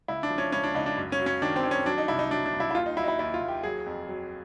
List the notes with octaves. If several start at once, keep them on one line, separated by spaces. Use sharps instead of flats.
C#2 E4
D4
F3
C#4
C#2 C#4
D4
C#2 D#4
D4
F#2
C#4
F#3
C#4
D#3 D4
C4
D#3
C#4
F#3 D4
D#4
C2 E4
D#4
F#3 D4
D4
C2
E4
E4
D#2 F4
D#4
F#3 E4
D#4
E4
D#2 E4
F4
D#2
G4
F#3 G#4
F2
F#3